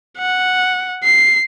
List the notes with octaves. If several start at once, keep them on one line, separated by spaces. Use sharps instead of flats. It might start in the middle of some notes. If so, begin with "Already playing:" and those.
F#5
C7